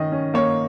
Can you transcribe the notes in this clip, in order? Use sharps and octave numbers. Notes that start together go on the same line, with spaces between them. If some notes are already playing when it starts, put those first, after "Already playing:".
Already playing: D#3 C#4 D#5
C#4
A#3 C#5